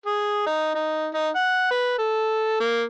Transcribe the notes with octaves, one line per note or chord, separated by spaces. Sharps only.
G#4
D#4
D#4
D#4
F#5
B4
A4
A#3